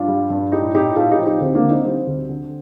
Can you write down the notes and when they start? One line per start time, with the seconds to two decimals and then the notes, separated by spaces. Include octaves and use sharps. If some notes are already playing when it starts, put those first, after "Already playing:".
Already playing: G2 D4 F4
0.08 G3
0.30 G2
0.52 A2 D#4 G4
0.74 A2 D#4 G4
0.96 A2 F4 A4
1.11 D#4 G4
1.18 F3
1.26 D#4 G4
1.40 D2 C4
1.55 A#3 D4
1.63 D3
1.70 C4 D#4
1.85 G3 C4
2.07 D2
2.29 D3